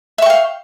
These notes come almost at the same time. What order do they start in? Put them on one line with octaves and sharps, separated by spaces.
E5 C#6 G5 F5